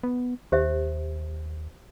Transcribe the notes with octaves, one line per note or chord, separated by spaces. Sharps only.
B3
D#2 G4 C5 E5